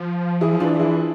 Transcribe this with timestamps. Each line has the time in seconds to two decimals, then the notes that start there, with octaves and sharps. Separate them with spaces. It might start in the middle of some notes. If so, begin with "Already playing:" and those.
Already playing: F3
0.41 E3 E4 G#4
0.52 F3
0.60 E3 D4 F4
0.79 E4 G#4